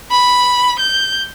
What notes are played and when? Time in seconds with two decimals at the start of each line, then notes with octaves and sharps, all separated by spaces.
0.12 B5
0.80 G6